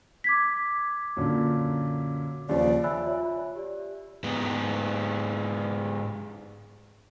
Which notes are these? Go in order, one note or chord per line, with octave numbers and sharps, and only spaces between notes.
D6 G#6 B6
F#2 A#2 D3
D#2 C#3 F3 D5
D5 E5 G#5 B5 E6 F#6
F4 C#5 E5
G4 D5
G#2 B3